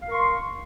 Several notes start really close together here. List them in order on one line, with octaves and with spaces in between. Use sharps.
F5 A#4 C#6 C6